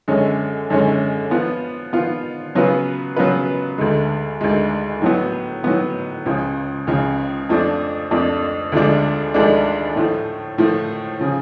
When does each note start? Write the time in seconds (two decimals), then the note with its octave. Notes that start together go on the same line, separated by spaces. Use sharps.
0.08 F#2 D3 G#3 C#4
0.70 F#2 D3 G#3 C#4
1.31 F3 B3 F4
1.93 F3 B3 F4
2.55 C#3 F#3 B3 F4 B4
3.16 C#3 F#3 B3 F4 B4
3.78 D2 D3 G#3
4.41 D2 D3 G#3
5.02 A2 F#3 B3
5.64 A2 F#3 B3
6.25 C#2 C#3 F3
6.87 C#2 C#3 F3
7.49 F2 F3 A3 D4
8.11 F2 F3 A3 D4
8.72 D2 D3 F3 G#3 D4
9.34 D2 D3 F3 G#3 D4
9.96 A2 F3 A3
10.58 A2 F3 A3
11.20 C#3 F3